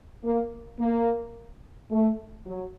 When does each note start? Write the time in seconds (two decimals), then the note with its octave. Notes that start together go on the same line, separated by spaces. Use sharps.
0.24 A#3
0.79 A#3
1.91 A3
2.46 F#3